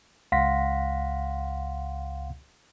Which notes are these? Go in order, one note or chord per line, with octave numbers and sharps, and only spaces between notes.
C#2 F5 F#5 C6 A#6 B6